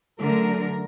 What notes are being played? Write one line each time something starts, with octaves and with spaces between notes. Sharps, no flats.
F#2 D3 A3 A#4